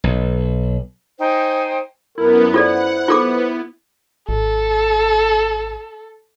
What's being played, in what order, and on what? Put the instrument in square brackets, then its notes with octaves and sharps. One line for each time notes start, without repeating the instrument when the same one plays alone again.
[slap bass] B1
[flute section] D#4 C5 G5 G#5
[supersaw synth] F#2 B3 [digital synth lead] E4 [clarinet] A#4
[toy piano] F4 A4 D5 [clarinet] C5 [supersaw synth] F#5
[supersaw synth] B3 [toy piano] F4 A4 D6
[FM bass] G#1 [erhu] A4